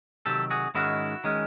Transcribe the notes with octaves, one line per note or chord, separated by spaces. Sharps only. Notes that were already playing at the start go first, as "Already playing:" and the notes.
C3 D#3 F#3 G4 A4
F#4 G#4
G#2 D#3 G#3 C#4 E4 F#4
D#3 G#3 C#4